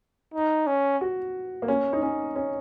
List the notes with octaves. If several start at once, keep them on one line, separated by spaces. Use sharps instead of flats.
D#4
C#4
F#4
A#3
C#4
D#4
C#4
C#4